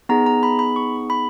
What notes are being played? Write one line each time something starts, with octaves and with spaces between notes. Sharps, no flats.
B3 D#4 G#4 A#5
A#5
B5
B5
C#6
B5